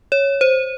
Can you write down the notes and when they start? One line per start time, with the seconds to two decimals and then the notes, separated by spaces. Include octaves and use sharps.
0.12 C#5
0.41 C5